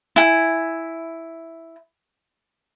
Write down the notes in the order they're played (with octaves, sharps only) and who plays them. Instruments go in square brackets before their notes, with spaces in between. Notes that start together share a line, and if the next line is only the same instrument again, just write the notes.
[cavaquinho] E4 G#5